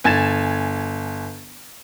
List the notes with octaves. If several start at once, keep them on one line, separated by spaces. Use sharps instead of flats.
G1 G#5 G#6 A6 E7